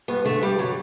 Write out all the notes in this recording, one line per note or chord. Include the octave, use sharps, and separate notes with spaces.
G2 B3
D3 A3
G2 G3
D3 F#3